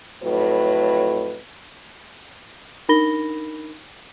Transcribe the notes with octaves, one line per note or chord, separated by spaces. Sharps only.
F2 A2 F#3 B4
D4 D#4 A#4 B5 A#6 G7